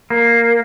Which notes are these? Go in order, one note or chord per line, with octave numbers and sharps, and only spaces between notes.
A#3